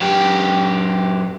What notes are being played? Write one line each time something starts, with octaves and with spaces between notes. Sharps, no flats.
F#2 G4